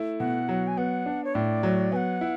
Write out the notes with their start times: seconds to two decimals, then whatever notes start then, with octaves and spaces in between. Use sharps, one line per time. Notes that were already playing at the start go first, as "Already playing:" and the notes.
Already playing: A3 E4
0.20 B2 F#5
0.49 F#3
0.67 G#5
0.77 B3 F#5
1.06 D4
1.24 C#5
1.34 A2 D5
1.63 F#3
1.92 B3 G#5
1.96 F#5
2.21 E4